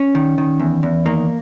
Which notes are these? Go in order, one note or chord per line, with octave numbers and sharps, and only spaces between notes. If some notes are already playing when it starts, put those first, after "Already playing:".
Already playing: C#4
D#3
D#3
E2
E2
D#3 A#3